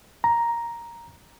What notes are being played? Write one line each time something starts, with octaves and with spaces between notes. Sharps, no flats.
A#5